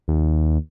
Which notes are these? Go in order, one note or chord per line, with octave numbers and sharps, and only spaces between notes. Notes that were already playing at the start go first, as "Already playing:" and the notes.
D#2